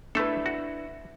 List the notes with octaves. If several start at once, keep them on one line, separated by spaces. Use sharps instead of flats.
A3 D4 E4 A4 B4
F#4